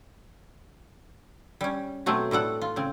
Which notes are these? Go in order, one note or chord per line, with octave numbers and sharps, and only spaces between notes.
G3 C#4
B2 F#3 A3 C4
A2 G3 A4 F#5
F4
C#3 C4